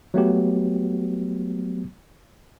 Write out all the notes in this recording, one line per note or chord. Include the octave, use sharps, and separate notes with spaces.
F#3 A3 B3 G4